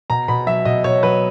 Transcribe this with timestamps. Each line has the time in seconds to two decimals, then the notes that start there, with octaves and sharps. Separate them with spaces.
0.10 B2 A#5
0.28 B2 B5
0.47 F#3 E5
0.65 B2 D#5
0.84 B2 C#5
1.03 F#3 B4